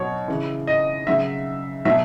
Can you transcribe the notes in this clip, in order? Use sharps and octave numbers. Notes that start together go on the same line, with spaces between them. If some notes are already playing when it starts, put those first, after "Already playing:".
Already playing: B2 F#3 C#5
C#3 E3
D#5
C#3 F#3 E5
B2 F#3 E5